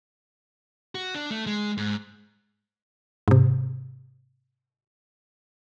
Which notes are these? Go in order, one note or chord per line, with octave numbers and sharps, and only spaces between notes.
F#4
D4
A3
G#3
G#2
G#2 C3